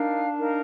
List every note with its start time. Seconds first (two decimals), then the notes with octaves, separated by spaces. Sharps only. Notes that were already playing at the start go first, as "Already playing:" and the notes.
Already playing: D4 D#4 A#4 F5
0.39 D#4 A#4 F5